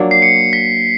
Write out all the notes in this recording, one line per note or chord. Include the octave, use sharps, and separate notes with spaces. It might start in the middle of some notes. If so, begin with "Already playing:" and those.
Already playing: F#3 A#3 D4
C7
C#7
B6